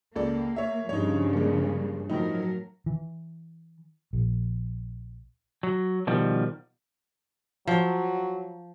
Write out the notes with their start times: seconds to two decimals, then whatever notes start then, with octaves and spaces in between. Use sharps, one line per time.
0.16 C#2 A#3 A4 D5
0.56 C#5 E5
0.89 G2 C#3 F3 D#4 C#5
1.33 G#3 A#3
2.10 A2 F3 F#3 A3 D#4 A#4
2.86 E3
4.13 A#1
5.63 F#3
6.07 B2 D#3 F3 G3
7.67 F3 F#3